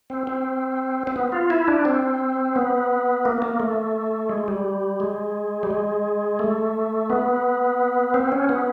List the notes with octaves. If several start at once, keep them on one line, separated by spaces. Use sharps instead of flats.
C4
C4
C4
B3
F4
E4
D4
C4
B3
A#3
A#3
A3
G#3
G3
G#3
G3
G#3
A3
B3
C4
C#4
B3